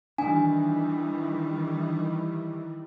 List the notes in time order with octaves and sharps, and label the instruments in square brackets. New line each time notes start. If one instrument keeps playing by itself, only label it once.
[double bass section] D#3 E3 G3 [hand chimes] D4 [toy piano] G#5